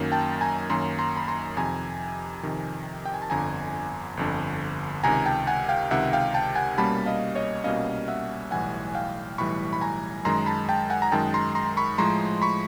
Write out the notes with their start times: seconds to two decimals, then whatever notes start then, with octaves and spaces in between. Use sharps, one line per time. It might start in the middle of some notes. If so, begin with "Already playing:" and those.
Already playing: F#2 D#3 F#3 A#3 C#4
0.12 G5 A5
0.41 G#5 A#5
0.70 F#2 D#3 F#3 A#3 C#4 A#5 C6
0.99 A#5 C6
1.17 B5
1.28 A#5 C6
1.57 F2 C3 D#3 G#5 A#5
2.43 F2 C3 D#3
3.05 G5
3.14 G#5
3.22 A5
3.30 G1 F2 D3 G#5 A#5
4.17 G1 F2 D3
5.04 C#2 C3 D#3 G#5 A#5
5.26 G5 A5
5.47 F#5 G#5
5.69 F5 G5
5.91 C#2 C3 D#3 E5 F#5
6.13 F5 G5
6.34 G5 A5
6.55 F#5 G#5
6.78 C2 B2 G3 A#3 C#4 A5 B5
7.06 D#5 F5
7.35 C#5 D#5
7.64 C2 B2 G3 A#3 C#4 D#5 F5
8.08 E5 F#5
8.51 B1 A2 E3 G3 F#5 G#5
8.95 F5 G5
9.38 B1 A2 E3 G3 B5 C#6
9.73 B5
9.81 G#5 A#5
10.25 F#2 D#3 G#3 A#5 C6
10.46 A5 B5
10.69 G5 A5
10.90 F#5 G#5
11.02 A#5
11.12 F#2 D#3 G#3 G5 A5
11.34 A#5 C6
11.55 A#5 C6
11.77 B5 C#6
11.98 A2 F3 G#3 A#5 C6
12.42 B5 C#6